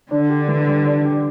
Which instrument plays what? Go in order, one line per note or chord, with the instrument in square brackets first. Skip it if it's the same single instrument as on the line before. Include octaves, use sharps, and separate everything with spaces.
[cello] D3 [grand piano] D4
[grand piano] G4
E3
G3
D4
G4